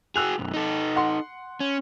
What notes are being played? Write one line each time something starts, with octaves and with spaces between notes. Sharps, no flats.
F#4 G#4 E6 F#6 F7
B1 F#2
D#4 A4
F#5 C6
C#4